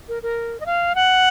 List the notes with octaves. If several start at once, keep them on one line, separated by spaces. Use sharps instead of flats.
A#4
A#4
D#5
F5
F#5